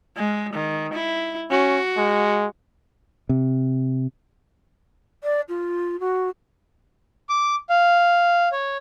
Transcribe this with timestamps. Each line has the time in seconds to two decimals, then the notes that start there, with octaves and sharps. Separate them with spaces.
0.16 G#3
0.53 D#3
0.93 E4
1.50 C#4 F#4
1.97 G#3
3.29 C3
5.24 D5
5.49 F4
6.00 F#4
7.29 D6
7.69 F5
8.52 C#5